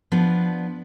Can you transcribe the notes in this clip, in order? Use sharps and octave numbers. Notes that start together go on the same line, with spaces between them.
F3 B3 D4